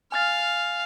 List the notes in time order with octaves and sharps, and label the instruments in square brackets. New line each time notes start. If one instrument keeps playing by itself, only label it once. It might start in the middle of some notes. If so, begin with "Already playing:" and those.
[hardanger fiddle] F5 [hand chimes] G#5 F6 A6